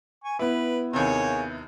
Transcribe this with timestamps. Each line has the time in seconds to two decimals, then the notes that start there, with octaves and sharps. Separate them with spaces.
0.24 G#5 C#6
0.39 B3 E4 B4
0.93 D#2 C3 A#3 G#4 C#5